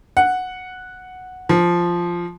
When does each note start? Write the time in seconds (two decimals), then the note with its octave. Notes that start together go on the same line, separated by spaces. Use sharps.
0.17 F#5
1.49 F3